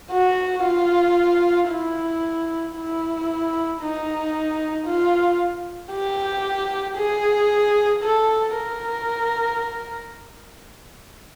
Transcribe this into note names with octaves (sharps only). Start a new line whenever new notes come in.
F#4
F4
E4
E4
D#4
F4
G4
G#4
A4
A#4